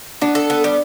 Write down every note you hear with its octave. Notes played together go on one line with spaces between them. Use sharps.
B3 D4
A4
B3
G3